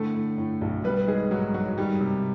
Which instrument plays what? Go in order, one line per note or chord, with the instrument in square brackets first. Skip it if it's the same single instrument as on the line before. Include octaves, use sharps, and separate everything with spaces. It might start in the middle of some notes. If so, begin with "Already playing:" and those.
Already playing: [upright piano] A2 D3 A3 A4
A2
A2
B1
G3 B3 B4
D#3 G#3 G#4
G#2 F#3 F#4
G#2 F#3 F#4
D#3 G3 G4
C3